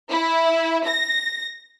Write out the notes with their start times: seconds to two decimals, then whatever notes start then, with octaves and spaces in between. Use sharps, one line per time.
0.10 E4
0.86 A#6